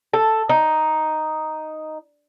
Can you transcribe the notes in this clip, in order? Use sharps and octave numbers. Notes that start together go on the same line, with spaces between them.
A4
D#4